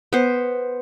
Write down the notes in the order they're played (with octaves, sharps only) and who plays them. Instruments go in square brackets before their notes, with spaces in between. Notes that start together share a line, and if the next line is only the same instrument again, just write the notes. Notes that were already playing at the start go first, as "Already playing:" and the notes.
[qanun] B3 C5